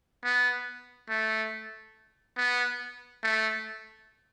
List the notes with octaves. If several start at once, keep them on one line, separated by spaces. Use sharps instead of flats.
B3
A3
B3
A3